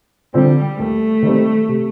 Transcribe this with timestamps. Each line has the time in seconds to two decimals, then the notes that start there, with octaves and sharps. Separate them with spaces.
0.34 D3 F3 G3 C4
0.79 D#2 A3
1.23 D#3 G3 C4
1.68 C3